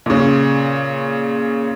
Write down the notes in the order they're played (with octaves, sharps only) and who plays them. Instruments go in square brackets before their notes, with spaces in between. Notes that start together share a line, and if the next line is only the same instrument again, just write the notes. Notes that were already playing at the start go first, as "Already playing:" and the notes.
[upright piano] A#2 C#3